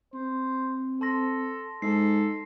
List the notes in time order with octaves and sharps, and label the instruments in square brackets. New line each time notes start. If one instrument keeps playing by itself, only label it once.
[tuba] C4 [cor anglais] C5
[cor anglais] A4 [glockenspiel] A5 C6 A#6
[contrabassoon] G#2 [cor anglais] A4 [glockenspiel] C7